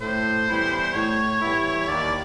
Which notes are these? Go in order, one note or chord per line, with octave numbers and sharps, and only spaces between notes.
A2 C5
E3 G3 B3 E4
A2 C#5
E3 G3 B3 E4
D#2 D5